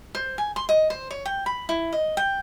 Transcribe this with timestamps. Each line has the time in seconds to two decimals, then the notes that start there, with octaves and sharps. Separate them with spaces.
0.15 C5
0.38 G#5
0.56 C6
0.69 D#5
0.90 C5
1.11 C#5
1.25 G5
1.46 B5
1.69 E4
1.92 D#5
2.17 G5